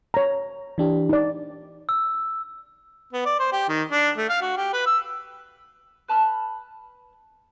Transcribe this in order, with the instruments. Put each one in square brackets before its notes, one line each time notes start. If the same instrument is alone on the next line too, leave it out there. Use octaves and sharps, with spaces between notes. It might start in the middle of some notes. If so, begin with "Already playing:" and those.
[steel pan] C#5 A#5
[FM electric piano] E3 D4 G4
[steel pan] D#4 D5
[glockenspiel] E6
[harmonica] B3
D5
C5
G4
D#3
D4
A3
F5
F#4
G4
B4
E6
[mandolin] B4 A5 B5 F6